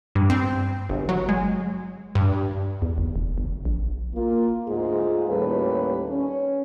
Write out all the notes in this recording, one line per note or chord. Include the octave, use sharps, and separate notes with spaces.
G2
C4
G1
F#3
G#3
G2
E2
G1
F1
G1
A#1
A#3 F4
D2 G#2 F4 G#4
D#2 A2 G3 C#4 A4 B4
C#4